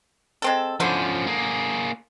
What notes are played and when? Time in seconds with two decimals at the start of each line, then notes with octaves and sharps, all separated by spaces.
0.42 G#3 C4 A4
0.80 D3 F3 C#4 E4 C5
1.26 A#3 G#4